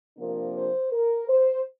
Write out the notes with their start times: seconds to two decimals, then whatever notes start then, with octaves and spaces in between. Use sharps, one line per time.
0.17 C3 F3 A#3 D4 A#4
0.54 C5
0.92 A#4
1.28 C5